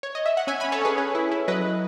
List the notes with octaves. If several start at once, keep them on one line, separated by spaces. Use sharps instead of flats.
C#5
D#5
E5
F#5
C#4 E5 G#5
G#5 B5
C#4
A4 C#5
C#4 G#4 B4
C#4
E4
E4
F#3 B4 D#5